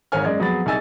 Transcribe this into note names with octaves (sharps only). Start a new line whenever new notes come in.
G#1 G#2 A#4 C#5 G#5 F6
F#2 G#3 D5 G#6
F2 F#3 B3 G#4 B5 A6
C2 D#4 G#4 G#5 E6 A6